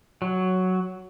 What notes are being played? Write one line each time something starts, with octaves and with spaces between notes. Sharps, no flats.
F#3